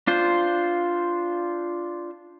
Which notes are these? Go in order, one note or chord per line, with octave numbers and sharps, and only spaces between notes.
D4 F4 C5